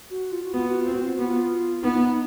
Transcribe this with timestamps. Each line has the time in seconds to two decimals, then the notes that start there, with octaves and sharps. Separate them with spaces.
0.10 F#4
0.32 F4
0.44 F#4
0.53 B3 F4
0.68 F#4
0.81 F4
0.86 C4
0.92 F#4
1.04 F4
1.16 B3 F#4
1.28 F4
1.83 B3 D#4